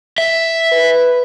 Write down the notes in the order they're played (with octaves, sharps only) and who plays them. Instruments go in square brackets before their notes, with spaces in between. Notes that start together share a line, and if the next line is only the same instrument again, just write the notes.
[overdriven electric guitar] E5
[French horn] B4